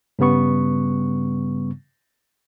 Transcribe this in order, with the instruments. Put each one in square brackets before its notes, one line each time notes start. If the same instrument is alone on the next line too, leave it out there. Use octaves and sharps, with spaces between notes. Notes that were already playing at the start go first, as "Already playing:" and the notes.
[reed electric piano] G2 C#3 G3 B3 C#6